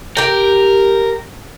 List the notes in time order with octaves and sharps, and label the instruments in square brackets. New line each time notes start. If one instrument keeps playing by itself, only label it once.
[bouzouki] G4 G5 [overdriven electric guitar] A#4